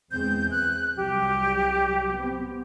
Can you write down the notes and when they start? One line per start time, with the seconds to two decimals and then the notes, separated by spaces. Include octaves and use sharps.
0.12 E2 G#3 C4 G6
0.51 E3 F#6
0.97 C2 F#3 G3 G4
2.13 B3 C4